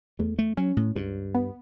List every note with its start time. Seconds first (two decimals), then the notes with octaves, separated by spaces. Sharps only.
0.19 E2 A3
0.39 A3
0.57 F#3 C#4
0.77 A2
0.96 C#2 G2
1.35 B3